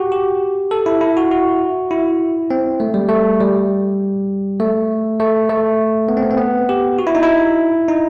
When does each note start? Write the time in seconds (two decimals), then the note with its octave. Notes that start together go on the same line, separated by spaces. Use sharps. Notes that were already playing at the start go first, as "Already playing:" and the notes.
Already playing: F#4 G4
0.12 G4
0.71 A4
0.86 E4
1.01 E4
1.17 F#4
1.31 F#4
1.91 E4
2.50 C4
2.80 A3
2.94 G3
3.09 A3
3.41 G3
4.60 A3
5.20 A3
5.49 A3
6.09 B3
6.17 C4
6.23 B3
6.30 C4
6.38 B3
6.69 G4
6.99 F#4
7.07 E4
7.15 D#4
7.23 E4
7.88 D#4